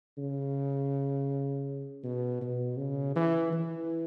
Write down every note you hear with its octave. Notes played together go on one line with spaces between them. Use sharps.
C#3
B2
B2
C#3
E3
E3